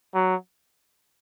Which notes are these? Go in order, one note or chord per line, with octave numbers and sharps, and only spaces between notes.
F#3